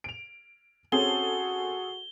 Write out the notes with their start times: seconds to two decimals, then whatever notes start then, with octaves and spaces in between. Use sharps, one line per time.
0.04 D7 F7
0.92 C4 C#4 F#4 G#4 A4 G7